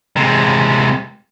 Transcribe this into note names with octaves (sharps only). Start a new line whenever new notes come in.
C3 G#3